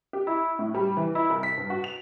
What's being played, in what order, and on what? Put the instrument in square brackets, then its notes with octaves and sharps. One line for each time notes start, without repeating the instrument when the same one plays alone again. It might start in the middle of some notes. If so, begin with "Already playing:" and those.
[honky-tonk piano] G4
E4
A2
G3
E3
E4
C2
B6
G2
F#4
F7